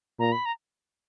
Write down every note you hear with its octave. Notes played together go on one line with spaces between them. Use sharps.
A#2 A#5
B5
A#5